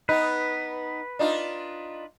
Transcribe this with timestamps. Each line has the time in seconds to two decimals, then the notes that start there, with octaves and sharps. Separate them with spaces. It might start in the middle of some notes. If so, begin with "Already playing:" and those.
0.09 B3 D#4 B4
1.19 D4 D#4 F4